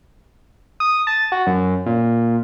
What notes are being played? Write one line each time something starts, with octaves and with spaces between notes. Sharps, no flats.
D#6
A5
F#4
F#2
A#2